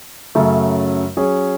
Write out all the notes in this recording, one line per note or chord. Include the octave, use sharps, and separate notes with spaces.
F#2 C#3 F#3 A3
F#3 C#4 G#4